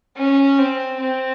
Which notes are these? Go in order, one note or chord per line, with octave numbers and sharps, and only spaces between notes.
C#4
C4
C4